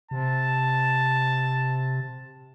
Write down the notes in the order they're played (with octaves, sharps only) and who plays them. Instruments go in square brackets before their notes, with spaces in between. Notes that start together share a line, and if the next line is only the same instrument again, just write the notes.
[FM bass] C3 [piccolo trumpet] A5